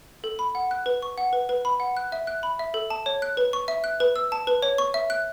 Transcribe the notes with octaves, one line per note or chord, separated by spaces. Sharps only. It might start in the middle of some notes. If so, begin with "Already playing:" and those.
A4
B5
F#5
F#6
B4
C#6
F#5
B4
B4
B5
F#5
F#6
E5
F#6
B5
E5
A4
A5
C#5
F#6
B4
C#6
E5
F#6
B4
E6
A5
B4
C#5
C#6
E5
F#6